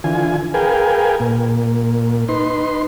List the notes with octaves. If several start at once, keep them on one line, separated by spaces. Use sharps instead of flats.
D3 E3 F4 G#5
G#4 A#4 B4 F5 G5 G#5
A#2
D#4 B4 C6